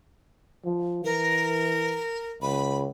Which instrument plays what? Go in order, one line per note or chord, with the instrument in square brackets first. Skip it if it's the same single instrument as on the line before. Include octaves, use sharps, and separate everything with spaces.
[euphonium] F3
[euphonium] E3 [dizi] A#4
[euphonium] C#2 [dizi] B5